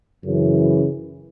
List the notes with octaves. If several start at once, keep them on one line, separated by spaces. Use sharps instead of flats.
F#2 C#3 E3